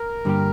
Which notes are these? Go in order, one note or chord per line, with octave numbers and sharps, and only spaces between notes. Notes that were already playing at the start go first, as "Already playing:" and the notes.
Already playing: A#4
G2 D3 G3 A#3 G4